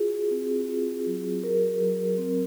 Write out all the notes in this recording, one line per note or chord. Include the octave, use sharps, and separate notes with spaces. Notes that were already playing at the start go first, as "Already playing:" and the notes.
Already playing: F4 F#4 G#4
C4
F4
F#3
F#4 A#4
F#3
C4